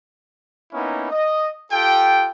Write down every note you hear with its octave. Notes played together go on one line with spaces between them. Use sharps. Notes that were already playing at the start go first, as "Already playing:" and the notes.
A#3 B3 C#4 D#4 E4
D#5
F4 G4 A4 G5